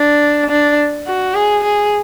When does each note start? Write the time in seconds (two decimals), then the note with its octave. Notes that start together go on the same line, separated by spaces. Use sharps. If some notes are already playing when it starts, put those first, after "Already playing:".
Already playing: D4
0.50 D4
1.07 F#4
1.34 G#4
1.64 G#4